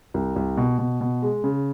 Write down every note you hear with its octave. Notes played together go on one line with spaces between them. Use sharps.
C2
C2
B2
B2
B2
G#3
C#3